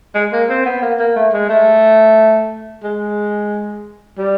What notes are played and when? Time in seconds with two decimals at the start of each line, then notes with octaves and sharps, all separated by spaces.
0.15 G#3
0.32 A#3
0.49 C4
0.66 B3
0.82 A#3
0.99 A#3
1.16 A3
1.33 G#3
1.49 A3
2.84 G#3
4.19 G3